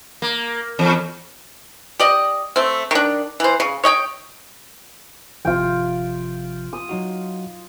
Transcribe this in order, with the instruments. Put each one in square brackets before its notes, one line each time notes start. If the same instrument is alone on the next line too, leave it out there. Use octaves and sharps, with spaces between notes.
[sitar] A#3
E2
[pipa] G4 D5 D#5
A3 C4
D#3 D4
E3 C5
C#3
C#5 D#5 G5
[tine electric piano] G#1 C3 F3 [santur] F4 G5
[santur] D#6
[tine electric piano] F#3 D#4 F#4